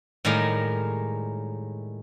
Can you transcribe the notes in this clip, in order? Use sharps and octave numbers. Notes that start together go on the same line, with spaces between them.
A2 D#3 G3 G#3 A#4 F5